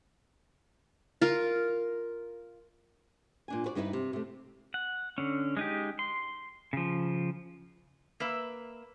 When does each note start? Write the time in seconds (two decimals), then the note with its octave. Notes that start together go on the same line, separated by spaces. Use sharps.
1.22 F4 A#4
3.48 A#2 D4 G#5
3.64 F#4 B4 D5
3.75 G2 B3 D#4 E4 A#4 B4
3.93 C3
4.13 C3 A3
4.74 F#5
5.18 D3 C#4
5.57 G#3 D#4 G4
5.99 C6
6.73 C#3 F3
8.20 A#3 B4 E5